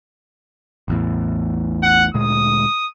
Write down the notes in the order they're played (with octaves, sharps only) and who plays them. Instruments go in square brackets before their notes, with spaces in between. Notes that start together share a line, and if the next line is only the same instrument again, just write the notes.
[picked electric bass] A1 E2 A2
[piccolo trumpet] F#5
[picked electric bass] D2 A#2 G#3 [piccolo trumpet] D#6